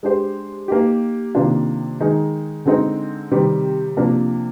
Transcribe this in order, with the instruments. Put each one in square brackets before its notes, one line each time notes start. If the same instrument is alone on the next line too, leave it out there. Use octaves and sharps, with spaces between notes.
[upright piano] G#3 D4 G4 C5
A#3 D#4 G4
C3 D#3 A#3 D4 F4
D#3 G#3 D#4 G#4
D3 G#3 C4 D#4
C3 D#3 G3 C4 G4
C3 F3 A#3 D4